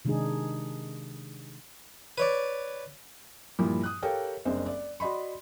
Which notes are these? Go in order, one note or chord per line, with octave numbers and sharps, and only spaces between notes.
C3 D#3 G#3 D4 D#4 G#4
B4 C#5 D5
G2 A#2 F3 E4
D#6 F#6
G4 A4 A#4 C#5 F5 G5
F#1 C2 D4 C5 D#5
D5
F#4 D5 D#5 B5 C6